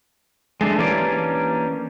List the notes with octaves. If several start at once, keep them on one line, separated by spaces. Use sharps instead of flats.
G#3 A3 D4
E3 A#3 C#4 D4 G4 D5